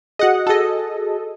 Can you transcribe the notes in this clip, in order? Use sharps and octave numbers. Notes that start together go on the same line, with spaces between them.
F#4 G#4 D#5 F#5
F#4 G#4 A4 D#5